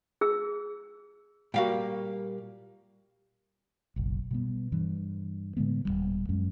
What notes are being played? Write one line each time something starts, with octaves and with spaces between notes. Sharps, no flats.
G#4 E6
A#2 G3 A#3 F#4 F5 G5
F#1 B1
B2 G3 B3
G2 E3
A2 D3 G#3 B3
D#1 F2 G3
F#2 F#3 G#3 C#4